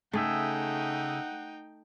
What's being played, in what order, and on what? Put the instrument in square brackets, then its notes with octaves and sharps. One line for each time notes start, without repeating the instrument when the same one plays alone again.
[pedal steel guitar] C#3 G#4 E5 [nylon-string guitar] A3 [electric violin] D#4 G5 [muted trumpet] F#5